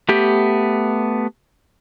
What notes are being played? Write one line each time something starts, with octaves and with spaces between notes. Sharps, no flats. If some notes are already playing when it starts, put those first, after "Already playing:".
A3 B3 G4 G6